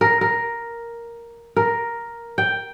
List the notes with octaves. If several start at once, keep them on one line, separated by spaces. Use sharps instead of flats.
A#4
A#4
A#4
G5